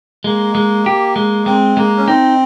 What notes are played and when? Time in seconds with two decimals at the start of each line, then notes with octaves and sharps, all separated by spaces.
0.24 G#3 A#3
0.55 G#3
0.86 G4
1.16 G#3
1.46 G#3 C4
1.77 G#3 A#3
1.97 C#4
2.07 C4 D#4